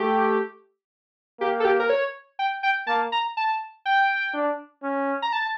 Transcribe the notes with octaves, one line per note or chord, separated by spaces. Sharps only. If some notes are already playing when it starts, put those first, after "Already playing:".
Already playing: A3 G4
A#3 G4
A4
G4
A#4
C#5
G5
G5
A#3 A5
A#5
A5
G5
D4
C#4
A#5
A5